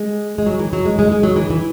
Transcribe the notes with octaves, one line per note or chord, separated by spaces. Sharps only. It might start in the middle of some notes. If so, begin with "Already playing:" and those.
Already playing: G#3
G#3
F#3
E3
F#3
G#3
G#3
G#3
F#3
E3
E3